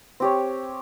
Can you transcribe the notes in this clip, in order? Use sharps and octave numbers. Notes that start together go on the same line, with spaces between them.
C4 G4 C#5